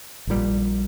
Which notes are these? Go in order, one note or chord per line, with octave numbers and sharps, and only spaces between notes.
A#1 A#2 G3